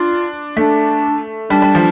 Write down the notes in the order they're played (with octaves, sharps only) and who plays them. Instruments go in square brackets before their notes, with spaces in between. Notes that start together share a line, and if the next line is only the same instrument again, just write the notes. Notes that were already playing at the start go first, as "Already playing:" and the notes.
Already playing: [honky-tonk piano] D4 [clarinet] F4
[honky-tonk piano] A3 [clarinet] D4
[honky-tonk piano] G3 [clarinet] D4
[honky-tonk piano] G3
F3